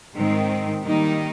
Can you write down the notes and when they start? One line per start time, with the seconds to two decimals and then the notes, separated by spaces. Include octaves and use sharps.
0.17 G#2 D#3 G#3 C4
0.83 D#3 G3 A#3 D#4